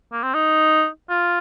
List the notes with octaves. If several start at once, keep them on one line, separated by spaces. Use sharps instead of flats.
A#3
C4
D#4
F4